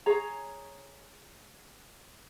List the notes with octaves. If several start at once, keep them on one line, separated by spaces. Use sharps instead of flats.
G#4 C#5 A#5